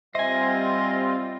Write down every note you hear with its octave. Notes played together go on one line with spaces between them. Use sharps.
G3 C4 F4 C5 D#5 E5 G#5